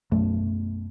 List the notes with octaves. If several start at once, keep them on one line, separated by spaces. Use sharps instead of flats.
B1 F#2 A3